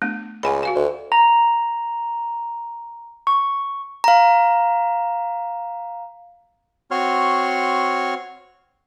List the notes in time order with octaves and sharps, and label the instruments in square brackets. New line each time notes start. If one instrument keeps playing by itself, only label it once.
[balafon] A3 B3 D4
[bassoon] C#2 [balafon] F#5 G#5 B5
[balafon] F#4 F5 G#5
[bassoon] D2
[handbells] A#5
C#6
[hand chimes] F5 A#5
[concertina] C4 F#4 C#5 C6 C#6 F6